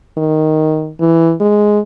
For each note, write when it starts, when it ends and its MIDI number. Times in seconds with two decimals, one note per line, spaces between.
0.18 0.92 51
1.00 1.34 52
1.41 1.80 56